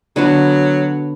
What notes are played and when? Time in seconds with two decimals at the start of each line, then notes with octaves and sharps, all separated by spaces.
0.16 D3 F#3 B3 F#4